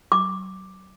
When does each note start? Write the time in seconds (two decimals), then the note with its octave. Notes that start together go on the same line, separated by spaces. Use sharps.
0.12 D6